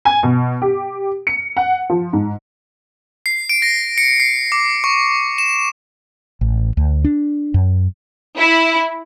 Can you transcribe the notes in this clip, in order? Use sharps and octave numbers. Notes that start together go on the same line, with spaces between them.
G#5
B2
G4
C#7
F#5
F3
G#2
C7
D7
A#6
C#7
C7
D6
C#6
E7
A1
D2
D4
F#2
E4